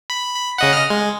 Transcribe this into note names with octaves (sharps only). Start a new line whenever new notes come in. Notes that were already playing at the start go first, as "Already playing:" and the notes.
B5
B5
C#3 D#5 F#5
D#5 F6
G#3